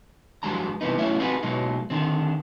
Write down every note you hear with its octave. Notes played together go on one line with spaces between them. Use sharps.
G2 F3 F#3 G#3 D4 A#5
G2 C3 E3 B3 D#4
F#3 A3 C#4 E4 C#5 E5
C4 D#4 F4 F#4 G#4 B4
B2 F#3 G#3 D#4
D3 D#3 C4